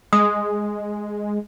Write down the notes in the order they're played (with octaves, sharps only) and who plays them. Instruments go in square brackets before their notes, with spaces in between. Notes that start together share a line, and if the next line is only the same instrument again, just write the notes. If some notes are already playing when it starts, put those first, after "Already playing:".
[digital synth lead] G#3 [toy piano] D#6